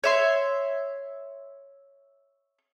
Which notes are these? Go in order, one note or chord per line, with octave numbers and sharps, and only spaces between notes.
C#5 E5 C6